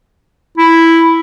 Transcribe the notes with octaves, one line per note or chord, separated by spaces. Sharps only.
E4